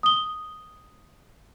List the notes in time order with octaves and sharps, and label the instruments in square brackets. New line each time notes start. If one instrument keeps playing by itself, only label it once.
[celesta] D#6 G7